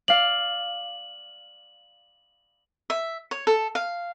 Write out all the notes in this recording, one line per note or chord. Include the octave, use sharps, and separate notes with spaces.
D5 F5 F#7
E5
C#5
A4
F5